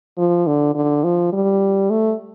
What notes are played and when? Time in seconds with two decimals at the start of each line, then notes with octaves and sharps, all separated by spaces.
0.17 F3
0.47 D3
0.75 D3
1.04 F3
1.32 G3
1.90 A3